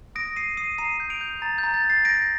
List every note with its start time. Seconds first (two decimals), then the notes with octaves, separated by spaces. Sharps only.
0.15 D#6 A#6 D7
0.36 D#6 C7 D#7
0.57 D#6 C7 D#7
0.78 A#5 C7 D#7
1.00 G6
1.10 D7 F7
1.21 G6
1.42 A#5 A6
1.58 G6
1.63 A#5
1.74 A6
1.84 G6
1.90 A6 C7
2.05 G6 A#6 D7